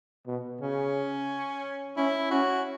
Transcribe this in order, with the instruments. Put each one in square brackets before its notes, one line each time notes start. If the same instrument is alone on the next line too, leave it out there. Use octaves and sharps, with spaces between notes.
[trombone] B2
[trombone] C#3 [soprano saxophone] C#4
[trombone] C#4 [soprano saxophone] E4
[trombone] C#4 [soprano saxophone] F#4